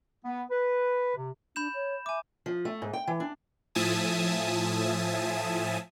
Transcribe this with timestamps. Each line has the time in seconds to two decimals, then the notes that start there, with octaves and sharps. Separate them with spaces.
0.25 B3
0.50 B4
1.16 C3
1.56 D4 B5 G6 E7
1.74 C#5
2.06 E5 G#5 D6
2.46 F3
2.65 A3
2.82 G#2
2.93 G5
3.07 E3
3.20 D4
3.75 A2 F3 E5 G#5 A5 D#6